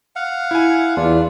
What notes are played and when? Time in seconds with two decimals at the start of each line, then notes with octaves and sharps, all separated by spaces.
0.16 F5 F#5
0.51 E4 G#5
0.96 E2 D4 F4